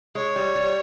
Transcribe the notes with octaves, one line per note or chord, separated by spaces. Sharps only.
G#3 C#5
G3
G3